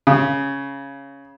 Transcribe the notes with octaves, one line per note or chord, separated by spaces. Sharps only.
C#3